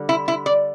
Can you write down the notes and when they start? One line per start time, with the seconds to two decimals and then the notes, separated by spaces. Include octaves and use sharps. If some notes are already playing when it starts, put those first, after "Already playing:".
Already playing: D3 G3
0.09 E4
0.28 E4
0.46 D5